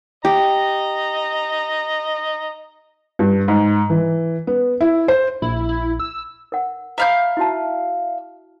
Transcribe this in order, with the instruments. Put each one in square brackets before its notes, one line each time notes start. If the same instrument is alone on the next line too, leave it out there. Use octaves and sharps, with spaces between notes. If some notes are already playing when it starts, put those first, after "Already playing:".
[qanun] G4 [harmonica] D#5 A#5
[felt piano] G2
G#2
E3
B3
E4
C5
[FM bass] A#1 [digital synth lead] E4
[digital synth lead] E4
E6
[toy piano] A#4 F#5
[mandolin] E5 F5 G6 [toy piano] A#5 B5
[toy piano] E4 F#4 A5